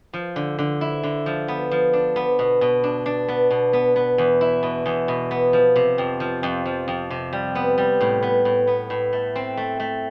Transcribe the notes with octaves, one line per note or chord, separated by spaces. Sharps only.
F3
D3
D3
E4
D3
F3
B3
F3
D4
B3
B2
B2
D4
D4
B3
B2
B3
B3
E2
E4
B2
E2
B2
B3
F3
C3
F2
F3
F2
F3
F2
C3
G3
B3
G3
A2
B3
A2
B3
A2
A3
C4
A3
A3